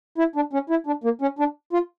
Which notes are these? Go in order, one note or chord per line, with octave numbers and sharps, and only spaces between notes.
E4
D4
C#4
E4
D4
A#3
C#4
D4
F4